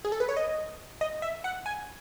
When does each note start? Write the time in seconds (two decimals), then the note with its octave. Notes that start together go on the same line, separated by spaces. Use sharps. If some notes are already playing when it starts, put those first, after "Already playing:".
0.05 G#4
0.12 A4
0.20 B4
0.29 C#5
0.37 D#5
1.01 D#5
1.22 E5
1.44 F#5
1.66 G#5